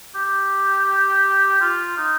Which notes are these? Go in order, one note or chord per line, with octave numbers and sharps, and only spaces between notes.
G4
F4
D#4